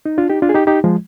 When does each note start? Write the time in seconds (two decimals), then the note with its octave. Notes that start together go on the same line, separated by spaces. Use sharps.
0.06 D#4
0.18 D4 F4
0.30 D#4 G4
0.42 D4 F4
0.49 G#4
0.55 D#4 G4
0.67 D#4 G4
0.84 F3 G#3